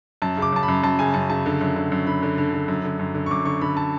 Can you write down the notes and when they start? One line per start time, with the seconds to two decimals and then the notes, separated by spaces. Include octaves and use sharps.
0.22 F#2 A5
0.37 C#3
0.42 D6
0.53 F#2 A5
0.63 B5
0.68 F#2
0.83 F#2 A5
0.99 C#3 G#5
1.14 F#2 A5
1.30 C#3 A5
1.46 D3
1.61 F#2
1.76 D3
1.92 F#2
2.07 D3 B5
2.23 D3
2.38 D3
2.54 D3
2.68 F#2
2.84 D3
2.99 F#2
3.14 D3
3.26 C#6
3.31 F#2 D6
3.45 D3 C#6
3.61 D3 B5
3.77 A5